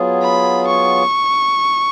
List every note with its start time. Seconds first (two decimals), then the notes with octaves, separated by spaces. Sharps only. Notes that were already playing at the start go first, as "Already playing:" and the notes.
Already playing: F#3 B3 F4 G#4
0.22 B5
0.67 C#6